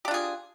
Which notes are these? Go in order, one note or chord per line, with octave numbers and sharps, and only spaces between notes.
D4 F4 G4 G#4